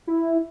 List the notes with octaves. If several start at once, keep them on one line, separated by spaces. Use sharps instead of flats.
E4